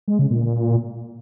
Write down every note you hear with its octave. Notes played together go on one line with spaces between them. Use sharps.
G#3
C#3
A#2